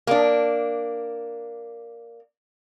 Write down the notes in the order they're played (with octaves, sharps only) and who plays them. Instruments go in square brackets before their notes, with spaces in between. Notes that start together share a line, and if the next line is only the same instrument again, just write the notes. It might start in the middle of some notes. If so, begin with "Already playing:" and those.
[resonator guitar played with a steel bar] A#3 D4